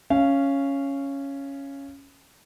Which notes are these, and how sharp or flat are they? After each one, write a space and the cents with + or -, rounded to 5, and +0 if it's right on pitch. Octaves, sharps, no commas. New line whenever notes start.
C#4 +0 F5 -20